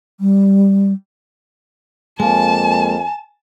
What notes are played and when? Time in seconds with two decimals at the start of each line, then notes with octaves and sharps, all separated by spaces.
0.20 G3
2.20 F2 G#3 A#3 G#5 A5